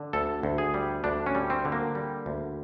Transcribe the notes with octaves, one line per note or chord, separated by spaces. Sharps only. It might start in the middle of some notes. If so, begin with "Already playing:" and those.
Already playing: D3
D2 A4
D2
G#4
G3
D2 D4
C#4
G3
C4
D3
A#3
G3
D2